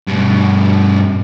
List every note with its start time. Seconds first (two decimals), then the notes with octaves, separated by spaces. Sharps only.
0.07 G2 B2